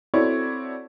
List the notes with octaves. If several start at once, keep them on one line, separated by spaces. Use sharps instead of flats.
C4 E4 F#4 A4 C#5 D5